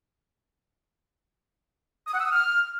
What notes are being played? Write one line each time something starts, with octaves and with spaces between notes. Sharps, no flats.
D#6
F#5
E6
D#6
F6